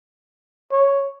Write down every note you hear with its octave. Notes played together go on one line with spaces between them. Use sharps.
C#5